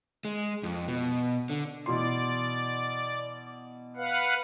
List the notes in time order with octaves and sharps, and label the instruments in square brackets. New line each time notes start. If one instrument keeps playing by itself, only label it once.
[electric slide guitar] G#3
F2
B2
D3
[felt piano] B2 E3 C6 [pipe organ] D5
[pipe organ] B4 F5 F#5